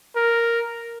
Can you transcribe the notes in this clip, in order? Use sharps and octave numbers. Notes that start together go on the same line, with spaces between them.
A#4